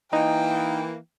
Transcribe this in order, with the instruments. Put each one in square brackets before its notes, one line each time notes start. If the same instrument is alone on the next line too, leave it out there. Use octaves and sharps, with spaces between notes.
[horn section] E3 A#3 [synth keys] D#4 [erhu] G5